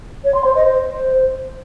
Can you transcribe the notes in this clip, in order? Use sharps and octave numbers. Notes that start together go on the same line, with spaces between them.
C#5
C6
C5
D#5
C5